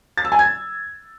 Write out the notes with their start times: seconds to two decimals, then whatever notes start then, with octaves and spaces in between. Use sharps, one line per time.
0.18 A6
0.25 E6
0.32 G#5
0.39 G#6